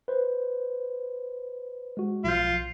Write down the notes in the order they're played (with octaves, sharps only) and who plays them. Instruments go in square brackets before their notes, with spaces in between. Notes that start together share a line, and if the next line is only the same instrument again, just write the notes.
[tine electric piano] B4 C5
G#3 F#4
[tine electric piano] B1 F3 G6 [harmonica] F4